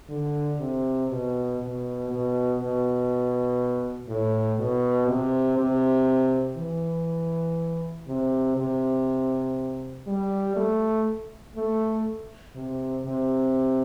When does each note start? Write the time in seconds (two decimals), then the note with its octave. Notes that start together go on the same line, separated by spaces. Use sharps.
0.10 D3
0.60 C3
1.10 B2
1.59 B2
2.09 B2
2.59 B2
4.08 A2
4.59 B2
5.08 C3
5.58 C3
6.57 E3
8.08 C3
8.57 C3
10.07 G3
10.57 A3
11.56 A3
12.56 C3
13.06 C3